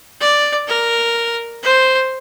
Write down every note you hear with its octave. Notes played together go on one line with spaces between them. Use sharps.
D5
A#4
C5